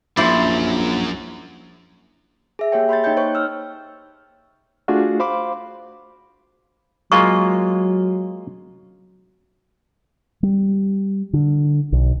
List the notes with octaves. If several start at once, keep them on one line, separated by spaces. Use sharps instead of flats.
A#1 F#2 E4 C5 D5
G#4 E5
A#3 G4 G#4 C#5 E5 G5
B5 C6 G6 A6
A#3 D#4 C#5 D#5 G5 G6
C5 C#5 C#6
E6 F6
A3 D4 F4 F#4 G#4
C5 F5 B5 C6 D6
F#3 G#3 A#3 F4 C#6
G3
D3
B1